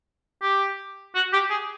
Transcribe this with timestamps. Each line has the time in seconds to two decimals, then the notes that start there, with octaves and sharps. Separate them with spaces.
0.42 G4
1.15 F#4
1.33 G4
1.50 G#4